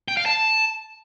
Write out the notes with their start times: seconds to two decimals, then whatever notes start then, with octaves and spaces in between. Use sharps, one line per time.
0.08 G5
0.17 F5
0.26 A5